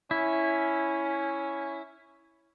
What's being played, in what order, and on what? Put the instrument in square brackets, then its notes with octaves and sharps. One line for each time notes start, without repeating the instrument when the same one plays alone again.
[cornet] C#4 [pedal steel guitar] E4